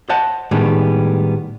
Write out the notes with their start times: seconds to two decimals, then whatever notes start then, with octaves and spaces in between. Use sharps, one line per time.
0.09 C5 D#5 F#5 A5
0.51 A2 D#3 G3 G#3 B3